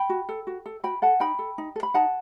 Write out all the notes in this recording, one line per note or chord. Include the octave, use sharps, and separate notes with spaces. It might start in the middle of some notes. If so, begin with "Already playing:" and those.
Already playing: G5 B5
F#4
A4
F#4
A4
F#4 G5 B5
A4 F#5 A5
D#4 G5 B5
A4
D#4
A4
B5
D#4 F#5 A5